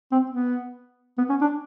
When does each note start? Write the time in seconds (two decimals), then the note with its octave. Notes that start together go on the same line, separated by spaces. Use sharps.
0.12 C4
0.30 B3
1.18 B3
1.29 C#4
1.41 D4